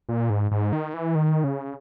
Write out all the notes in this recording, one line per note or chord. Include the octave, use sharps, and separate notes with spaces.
A#2
G#2
G#2
D#3
E3
D#3
C#3